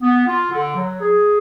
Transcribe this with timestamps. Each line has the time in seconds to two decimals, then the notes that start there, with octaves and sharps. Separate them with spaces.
0.01 B3
0.26 F4
0.51 D3
0.75 F#3
1.00 G#4